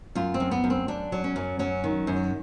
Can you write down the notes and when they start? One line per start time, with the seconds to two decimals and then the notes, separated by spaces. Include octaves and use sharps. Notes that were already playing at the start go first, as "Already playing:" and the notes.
0.15 F#2 F4
0.34 C4
0.40 F#2
0.51 B3
0.64 F#2
0.70 C4
0.88 F#2 D4
1.12 F#3
1.24 C#4
1.36 F#2
1.59 F#3 C#4
1.84 D#3
2.07 F#2